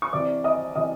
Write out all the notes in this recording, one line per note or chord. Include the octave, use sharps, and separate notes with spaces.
C#6
C3 E3 D5 D6
D#5 D#6
C3 E3 D#5 D#6